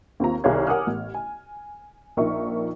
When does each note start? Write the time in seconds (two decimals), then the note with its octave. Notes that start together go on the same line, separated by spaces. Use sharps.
0.20 D#2 C4 F4 A#5
0.44 C2 D#3 G#4 C#5 F5 G#6
0.67 A#4 F#5 G#5 D6 D#6 F6
0.87 A1
1.14 G#5
2.17 A#1 F3 D#4 A#4 E5 C#6